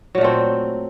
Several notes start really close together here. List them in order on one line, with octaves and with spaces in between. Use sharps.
F#3 A#2 A3 C4